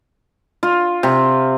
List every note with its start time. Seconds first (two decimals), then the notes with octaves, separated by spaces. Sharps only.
0.63 F4
1.03 C3